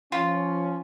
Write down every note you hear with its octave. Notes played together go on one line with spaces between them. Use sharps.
F3 C#4 F4